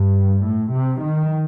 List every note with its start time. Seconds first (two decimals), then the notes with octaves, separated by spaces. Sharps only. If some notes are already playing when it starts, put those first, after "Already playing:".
Already playing: G2
0.43 A2
0.71 C3
1.01 D#3